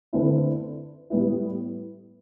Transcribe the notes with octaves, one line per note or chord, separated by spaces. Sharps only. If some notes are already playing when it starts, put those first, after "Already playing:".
D3 A3 C4 E4 B4
A2 G3 B3 E4